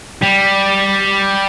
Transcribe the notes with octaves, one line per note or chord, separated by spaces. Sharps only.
G3